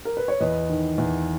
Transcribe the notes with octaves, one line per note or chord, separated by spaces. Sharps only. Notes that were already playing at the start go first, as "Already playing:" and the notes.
A#4
B4
C#5
E2 B4 D#5
D#3
E2